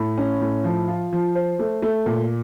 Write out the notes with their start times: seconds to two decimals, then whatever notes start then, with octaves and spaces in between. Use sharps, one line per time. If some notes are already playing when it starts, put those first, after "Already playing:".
Already playing: A2
0.18 C#4
0.41 A2
0.64 F3
0.88 F4
1.13 F3
1.35 C5
1.59 A3
1.82 A3
2.06 A#2